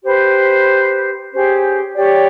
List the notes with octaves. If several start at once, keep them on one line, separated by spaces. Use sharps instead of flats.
G4 B4 C5
C#4 G4 G#4 C5
G4 C#5 D5